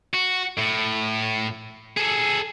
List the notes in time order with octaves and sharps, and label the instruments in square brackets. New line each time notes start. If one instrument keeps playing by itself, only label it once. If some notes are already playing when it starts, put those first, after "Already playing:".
[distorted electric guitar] F#4
A2
G#4 A4